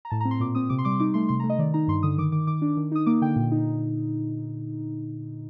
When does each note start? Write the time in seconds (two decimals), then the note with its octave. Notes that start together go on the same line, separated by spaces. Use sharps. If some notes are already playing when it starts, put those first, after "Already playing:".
0.05 A#5
0.10 A2 A5
0.21 A#5
0.25 C4
0.31 C6
0.40 A#2 D6
0.55 C4 D#6
0.70 C3 D6
0.78 C6
0.85 G3 D6
1.00 D#4 D6
1.14 A3 C6
1.29 C3 C6
1.40 A#5
1.44 A3
1.50 D#5
1.59 D#3 D5
1.74 D#4 A#5
1.88 G2 C6
2.03 D3 D#6
2.18 D#3 D6
2.32 D#3 D6
2.47 D#3 D6
2.62 D4
2.77 D#3
2.92 D#4 D#6
3.06 A#3 D6
3.22 D3 G5
3.36 A#2
3.52 D#4